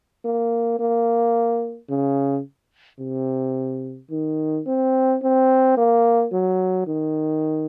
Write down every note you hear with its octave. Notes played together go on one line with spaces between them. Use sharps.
A#3
A#3
C#3
C3
D#3
C4
C4
A#3
F#3
D#3